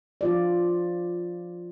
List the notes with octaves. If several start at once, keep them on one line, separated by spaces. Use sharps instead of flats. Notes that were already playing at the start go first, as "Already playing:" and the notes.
F3 F4 D5